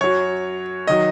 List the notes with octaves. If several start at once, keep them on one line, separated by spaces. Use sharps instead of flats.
F#2 F#3 C#5
D#3 F#3 D#5